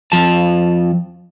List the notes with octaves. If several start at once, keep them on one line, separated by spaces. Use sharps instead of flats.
F2 F3 A5